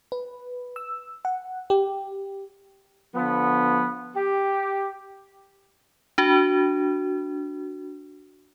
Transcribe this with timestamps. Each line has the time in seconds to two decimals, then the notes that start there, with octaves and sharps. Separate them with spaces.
0.12 B4
0.76 E6
1.25 F#5
1.70 G4
3.15 D3 F3 B3
4.16 G4
6.18 D4 F#4